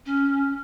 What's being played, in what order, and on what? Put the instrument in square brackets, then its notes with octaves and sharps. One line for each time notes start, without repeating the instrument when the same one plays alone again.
[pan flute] C#4